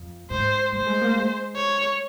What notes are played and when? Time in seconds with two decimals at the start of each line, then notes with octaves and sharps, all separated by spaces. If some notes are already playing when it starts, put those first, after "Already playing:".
Already playing: F2
0.30 G#2 C5
0.72 G3 C5
0.86 G#3
1.01 A#3
1.15 G#3
1.56 C#5